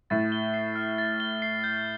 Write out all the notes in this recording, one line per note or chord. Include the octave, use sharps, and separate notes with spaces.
A2 A6
G7
C7
F6
A6
G7
C7
G6